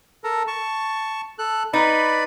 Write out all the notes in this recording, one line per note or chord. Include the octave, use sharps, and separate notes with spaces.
A4 A#4
A5 C#6
A4 F#6
D#4 B4 D5 B5